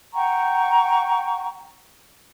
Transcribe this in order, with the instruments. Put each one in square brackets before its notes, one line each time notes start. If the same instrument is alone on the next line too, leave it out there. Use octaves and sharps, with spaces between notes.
[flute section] F#5 G5 A#5 C#6